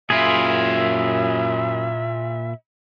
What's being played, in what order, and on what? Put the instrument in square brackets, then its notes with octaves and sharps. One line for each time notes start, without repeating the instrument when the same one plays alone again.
[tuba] F#2 [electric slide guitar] A#2 E4 [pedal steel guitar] F4 G#4 [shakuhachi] E5